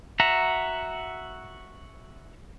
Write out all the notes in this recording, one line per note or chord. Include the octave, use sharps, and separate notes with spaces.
F#4 E5 F#5 A#5